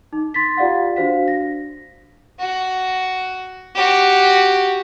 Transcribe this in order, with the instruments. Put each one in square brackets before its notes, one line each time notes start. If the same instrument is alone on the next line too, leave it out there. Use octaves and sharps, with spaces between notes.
[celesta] D#4
C6 A6 B6
F4 G4 D5 F5 F#5
D4 F#4 C5 F5 B6
A#6
[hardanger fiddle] F#4
F#4 G4